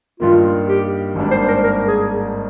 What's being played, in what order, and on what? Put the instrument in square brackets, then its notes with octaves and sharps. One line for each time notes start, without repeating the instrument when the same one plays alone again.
[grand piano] G2 D#3 A#3 [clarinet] F4
[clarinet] G4
[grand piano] G#1 G#2 G3 A#3 D4
[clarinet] C5
A#4
A#4
G#4